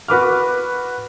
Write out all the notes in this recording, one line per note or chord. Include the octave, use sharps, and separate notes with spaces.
F#4 B4 D6 F6